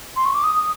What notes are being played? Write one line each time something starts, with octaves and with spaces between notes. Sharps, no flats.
C6
C#6
D6
D#6